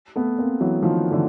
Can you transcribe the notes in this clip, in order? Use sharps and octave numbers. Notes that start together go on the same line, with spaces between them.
A3 B3
A#3 C4
E3 F#3
D#3 F3
D3 E3